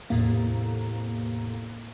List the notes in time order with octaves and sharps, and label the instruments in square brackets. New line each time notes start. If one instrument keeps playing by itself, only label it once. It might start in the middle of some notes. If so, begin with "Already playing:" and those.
[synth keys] E2 A2 C3 A#3